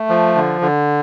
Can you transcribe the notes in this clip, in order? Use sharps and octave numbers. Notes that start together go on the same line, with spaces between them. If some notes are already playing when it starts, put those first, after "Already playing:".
Already playing: A3
F3
D3
D3